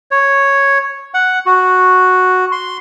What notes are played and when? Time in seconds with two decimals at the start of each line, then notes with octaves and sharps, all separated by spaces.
0.11 C#5
1.14 F#5
1.46 F#4
2.52 C6